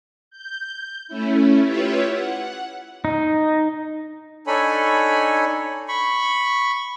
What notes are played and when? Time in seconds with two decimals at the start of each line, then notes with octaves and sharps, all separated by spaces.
0.31 G6
1.08 A3 C#4 E4
1.63 E4 F4 G4 B4 C#5 E5
2.08 F#5
3.05 D#4
4.47 D4 D#4 A4 C#5 G#5 B5
5.88 B5 C#6